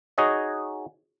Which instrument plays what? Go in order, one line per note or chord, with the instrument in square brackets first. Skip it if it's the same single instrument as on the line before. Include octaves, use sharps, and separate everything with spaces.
[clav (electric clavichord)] D#4 F#4 G#4 C#5 D#5